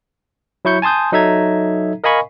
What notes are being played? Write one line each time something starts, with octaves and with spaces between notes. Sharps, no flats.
F#3 E4 C#6 G6 C#7
G#5 A5 C6 D#6 G6
F#3 D#4 A4 E5 A#5 G#6
A#4 D#5 F5 G#5 B5 C#6